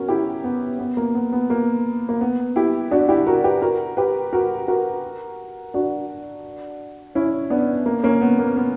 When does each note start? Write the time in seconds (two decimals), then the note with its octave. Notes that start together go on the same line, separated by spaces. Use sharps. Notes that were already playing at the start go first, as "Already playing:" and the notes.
Already playing: B3 C#4 F#4 A#4
0.09 E4 G4
0.44 B3
0.79 B3
0.97 A#3
1.15 B3
1.32 B3
1.50 A#3
2.09 A#3
2.21 B3
2.56 E4 G4
2.91 D4 F#4
3.09 E4 G4
3.27 F#4 A#4
3.44 G4 B4
3.62 F#4 A#4
3.97 G4 B4
4.33 F#4 A#4
4.68 F#4 A#4
5.74 D4 F#4
7.15 C#4 E4
7.50 B3 D4
7.86 A#3
8.03 A#3 C#4
8.21 B3
8.39 A#3
8.57 B3